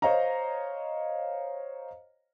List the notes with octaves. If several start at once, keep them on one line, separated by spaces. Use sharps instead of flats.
C5 C#5 D#5 F5 A#5